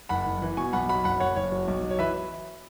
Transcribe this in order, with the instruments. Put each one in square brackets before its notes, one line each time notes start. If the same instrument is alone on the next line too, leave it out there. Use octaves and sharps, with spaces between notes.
[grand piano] F#1 F#5 B5
F#1
E3
B2 G#5 C#6
B1 F#5 B5
F#3 F#5 B5
F#1 F#5 B5
F#1 C#5 F#5
F#1 C#5
F#3
B1
F#3
C#5
E3 B4 E5